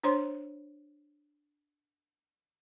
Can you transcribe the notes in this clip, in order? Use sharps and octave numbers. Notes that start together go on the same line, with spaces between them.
D4 C5 C#5 C6